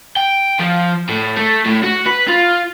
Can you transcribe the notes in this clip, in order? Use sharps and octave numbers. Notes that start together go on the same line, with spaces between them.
G5
F3
A2
A3
A2
F#4
B4
F4